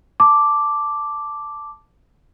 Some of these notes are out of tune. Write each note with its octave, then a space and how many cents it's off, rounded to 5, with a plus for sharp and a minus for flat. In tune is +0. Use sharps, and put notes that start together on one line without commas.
A5 +0 D6 +0